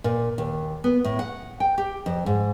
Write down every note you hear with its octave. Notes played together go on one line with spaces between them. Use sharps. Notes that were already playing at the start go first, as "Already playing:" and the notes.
A#2
D#2
B3
A2
F#5
G5
G4
F2
G#2